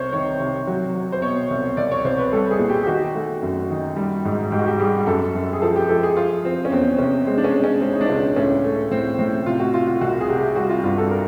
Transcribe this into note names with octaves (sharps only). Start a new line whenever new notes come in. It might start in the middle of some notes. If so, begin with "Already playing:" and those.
Already playing: C2 C3 C5 C#5
D#3 C#5
C3
F#3
F#3
C5
B2 C#5
C2
C2 D5
C#5
C2 C5
B4
G3 A4
G#4
A#2
G4
G4
D#3 F#4
A3
F#2
D#3
G3
G#2
G#2 G4
F#4
G4
G3 G#4
F#2 A4
F#2
G#4
F3 A4
G4
F3 A4
G#4
F3 F4
F3 C4
C#4
E2 C4
C3 C#4
G#3 C4
D4
C#4
G#3
C#4
G#3 C4
D#4
D4
C#2 C#4
A2 C#4
A3
A2 C4
A2 C4
C3 F4
F#4
C3 F4
F4
C2 F#4
G#4
C3 G4
G3 F#4
F4
G2 F4
A4
A#4